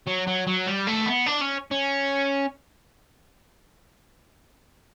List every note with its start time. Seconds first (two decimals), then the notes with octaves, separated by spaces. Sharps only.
0.07 F#3
0.27 F#3
0.47 F#3
0.66 G3
0.87 A3
1.06 B3
1.26 D4
1.41 C#4
1.71 C#4